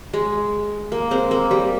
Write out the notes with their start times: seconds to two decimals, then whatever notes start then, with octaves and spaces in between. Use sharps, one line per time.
0.13 G#3
0.92 A#3
1.11 G#3 C4
1.31 A#3
1.51 G3